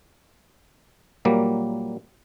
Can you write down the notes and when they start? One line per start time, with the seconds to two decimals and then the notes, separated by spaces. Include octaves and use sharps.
1.25 A#2 F#3 G3 A#3